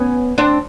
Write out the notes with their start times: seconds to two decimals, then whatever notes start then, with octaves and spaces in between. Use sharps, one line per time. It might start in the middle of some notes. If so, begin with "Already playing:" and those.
Already playing: B3 C#4
0.38 C4 D4